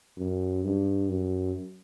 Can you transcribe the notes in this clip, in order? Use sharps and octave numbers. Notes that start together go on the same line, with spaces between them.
F#2
G2
F#2